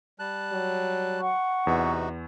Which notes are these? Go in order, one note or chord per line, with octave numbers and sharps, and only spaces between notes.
G3 A5 F#6
F#3
F#5 C#6
E2 C3 B3 D#4 F#4